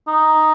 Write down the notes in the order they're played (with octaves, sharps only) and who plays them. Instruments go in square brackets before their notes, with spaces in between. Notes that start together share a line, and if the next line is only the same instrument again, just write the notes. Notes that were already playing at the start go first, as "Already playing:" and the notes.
[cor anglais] D#4